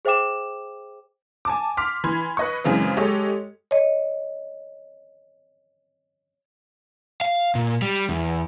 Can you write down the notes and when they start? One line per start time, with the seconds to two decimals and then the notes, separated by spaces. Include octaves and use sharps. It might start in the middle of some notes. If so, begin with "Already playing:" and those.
0.05 G#4 C5 E5 G5 D6 E7
1.45 G#5 A5 D6
1.77 C6 D6 F6 B6
2.04 E3 B5 C6 G#6
2.37 B4 D#5 C#6
2.64 F#2 C#3 E3 G#3 C4
2.97 G#3 G4 A4 C#5 D#5
3.71 C#5 D#5
7.21 F5
7.55 A#2
7.82 G3
8.09 E2